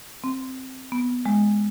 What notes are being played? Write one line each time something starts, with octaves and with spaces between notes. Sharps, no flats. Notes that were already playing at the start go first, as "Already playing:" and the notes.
C4
B3
G#3